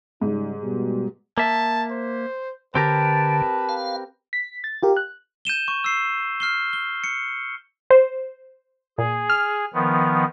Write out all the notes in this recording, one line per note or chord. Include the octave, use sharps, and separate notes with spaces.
G#2 C#3 G3 D#4
B2 G3
A#3 E5 A5
C5
D3 C4 G4 A#4 B4 A5
F5
B6
A6
F4 G4 A#4
F#6
G6 D#7 E7 G7
C#6
E6 C7
F6 C7 G7
G7
C#7
C5
A#2 G#4
F6
D#3 F3 B3